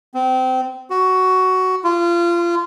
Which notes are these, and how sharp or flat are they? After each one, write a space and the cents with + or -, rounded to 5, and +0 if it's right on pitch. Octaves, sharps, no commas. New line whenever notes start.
C4 -25
F#4 +10
F4 -25